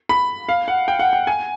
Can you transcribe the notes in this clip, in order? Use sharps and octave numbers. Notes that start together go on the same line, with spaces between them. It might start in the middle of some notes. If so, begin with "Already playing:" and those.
B5
F5
F#5
G5
F#5
G5
G#5